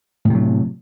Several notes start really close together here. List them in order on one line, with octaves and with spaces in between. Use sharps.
A2 C3 F#3